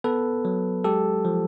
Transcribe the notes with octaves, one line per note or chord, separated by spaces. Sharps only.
B3 A4 B4
F#3
G#3 G4 A4
F3